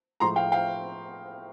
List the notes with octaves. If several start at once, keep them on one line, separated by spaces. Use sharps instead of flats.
A2 F3 G#3 A#5 C6
F5 G5
F5 G5